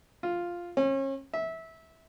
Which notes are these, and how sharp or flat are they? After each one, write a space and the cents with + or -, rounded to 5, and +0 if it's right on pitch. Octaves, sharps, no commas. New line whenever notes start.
F4 +0
C#4 -35
E5 -20